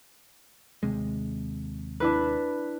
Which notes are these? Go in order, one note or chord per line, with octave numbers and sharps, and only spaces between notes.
D#2 C3 G#3
D4 E4 B4